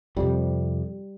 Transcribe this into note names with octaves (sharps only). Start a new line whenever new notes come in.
F2 C3 G3